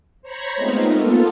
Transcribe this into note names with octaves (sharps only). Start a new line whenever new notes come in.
C5 C#5 A#5 B5 C#6
G#3 A3 B3 C4 D#4 F4
A#3 B3 F4 A4